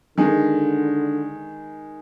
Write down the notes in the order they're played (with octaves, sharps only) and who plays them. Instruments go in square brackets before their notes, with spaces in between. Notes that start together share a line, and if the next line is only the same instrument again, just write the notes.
[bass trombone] D3 [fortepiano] D#3 G#3